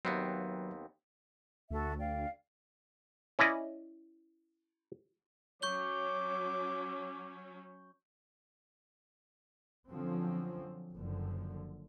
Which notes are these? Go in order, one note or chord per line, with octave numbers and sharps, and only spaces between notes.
D#2 F#3 B3 C4 B4 E5
D2 F#4 A4 E5
D5 F5 G5
C#4 E4 D5 D#5
F#3 C#4 C#5 C#6 D6 G6 G7
D3 F3 F#3 C4 C#4
F#1 F#2 D3 F3